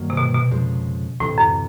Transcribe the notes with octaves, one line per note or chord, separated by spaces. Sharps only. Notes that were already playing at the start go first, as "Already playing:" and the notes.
Already playing: G2 D#3 F#3 A#3
C3
B2
B2
F2 C#3 F3 G#3
D2 A2 C3 E3
F#2